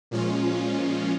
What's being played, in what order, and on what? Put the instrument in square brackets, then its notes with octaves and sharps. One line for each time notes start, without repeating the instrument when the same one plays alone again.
[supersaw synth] A#2 F3 G#3 C#4 F4